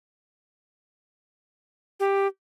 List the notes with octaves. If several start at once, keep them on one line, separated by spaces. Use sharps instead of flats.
G4